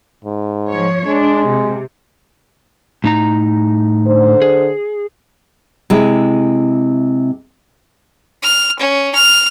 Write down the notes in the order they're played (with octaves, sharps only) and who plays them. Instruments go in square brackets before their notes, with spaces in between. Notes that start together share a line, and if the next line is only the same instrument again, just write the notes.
[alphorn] G#2
[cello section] F3 C#5
[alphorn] G#3 [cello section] D4
[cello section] C3
[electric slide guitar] A2 D#4 A#5
[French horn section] D3 C5
[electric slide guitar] G#4
[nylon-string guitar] C3 G#3 E4
[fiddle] F6
C#4
F6